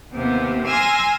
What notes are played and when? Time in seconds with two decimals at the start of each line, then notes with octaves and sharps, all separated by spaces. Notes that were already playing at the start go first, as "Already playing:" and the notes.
0.12 D#2 C3 B3
0.67 G#5 C6 E6 F6 G#6 A#6